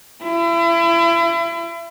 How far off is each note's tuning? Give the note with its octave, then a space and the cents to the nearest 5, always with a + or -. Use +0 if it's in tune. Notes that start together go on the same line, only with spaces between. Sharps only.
E4 +35